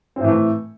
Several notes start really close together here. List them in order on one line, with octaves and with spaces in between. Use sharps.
C4 A2 E3 A3